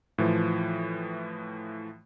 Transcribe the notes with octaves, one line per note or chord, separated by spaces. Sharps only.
A2 E3 F3